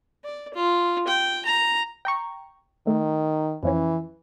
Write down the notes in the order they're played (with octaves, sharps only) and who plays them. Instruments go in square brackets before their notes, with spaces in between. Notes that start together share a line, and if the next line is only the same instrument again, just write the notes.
[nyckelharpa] D5
F4
G5
A#5
[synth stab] G5 A#5 C#6
[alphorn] D#3 [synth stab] A3
[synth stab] F2 F3 C#4 [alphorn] E3